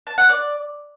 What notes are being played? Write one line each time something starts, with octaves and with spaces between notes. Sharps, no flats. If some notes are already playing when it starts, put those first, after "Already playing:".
A5
F#5
D5